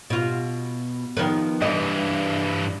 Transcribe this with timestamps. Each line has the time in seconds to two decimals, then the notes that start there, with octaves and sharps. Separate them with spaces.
0.10 B2 F4
1.17 D#3 F3 B3
1.62 G2 E3 D#5